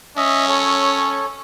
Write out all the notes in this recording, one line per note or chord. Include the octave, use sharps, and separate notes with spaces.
C#4 D#5 E5
A4 C#5